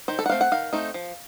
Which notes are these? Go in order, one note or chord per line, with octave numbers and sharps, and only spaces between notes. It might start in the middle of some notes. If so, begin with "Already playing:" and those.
D#3 C5
A4
F#5
A3 C4 F5
F#5
D#3 F5
A3 C4 D#4
F3